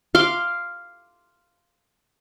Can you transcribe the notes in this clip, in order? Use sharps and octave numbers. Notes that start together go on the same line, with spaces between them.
F5 C6 D6